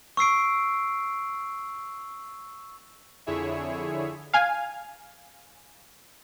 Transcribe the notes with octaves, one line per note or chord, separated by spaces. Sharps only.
C#6 E6 C7 D7
F2 D3 E4 G#4 C#5 E5
F5 G#5